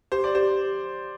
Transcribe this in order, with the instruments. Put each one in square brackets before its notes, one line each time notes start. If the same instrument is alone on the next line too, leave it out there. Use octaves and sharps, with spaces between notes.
[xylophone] G4 [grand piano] C5
[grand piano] D5
[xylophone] G4 [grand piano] C5